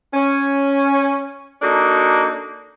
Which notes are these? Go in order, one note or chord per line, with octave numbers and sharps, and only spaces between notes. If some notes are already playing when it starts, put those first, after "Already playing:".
C#4
A#3 D4 D#4 F#4 A4